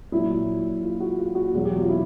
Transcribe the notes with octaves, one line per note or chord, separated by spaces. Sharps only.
A#2 F#3 E4
F4
F#4
F4
F#4
E2 B2 F#3 F4
G4
F#4
F4
E4